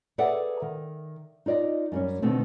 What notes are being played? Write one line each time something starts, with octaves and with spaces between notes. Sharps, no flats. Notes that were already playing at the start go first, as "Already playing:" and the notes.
G#4 A4 B4 D5 E5 F#5
D#3
D#4 F4 D5 D#5
F#2 G3 C#4
B2 D3 D#3 A3 B3 C4